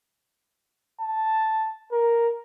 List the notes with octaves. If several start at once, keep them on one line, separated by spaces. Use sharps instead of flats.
A5
A#4